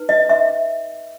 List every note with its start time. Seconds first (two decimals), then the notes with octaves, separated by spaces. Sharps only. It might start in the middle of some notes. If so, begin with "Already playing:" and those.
Already playing: D#4 B4
0.09 D#5
0.29 E5